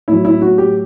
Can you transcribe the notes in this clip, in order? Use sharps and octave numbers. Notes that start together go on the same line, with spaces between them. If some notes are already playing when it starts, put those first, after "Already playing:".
A2 F#3 E4
E4
F#4
G4